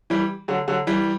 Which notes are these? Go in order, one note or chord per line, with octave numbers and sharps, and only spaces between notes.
E3 G3
D3 F#3
D3 F#3
E3 G3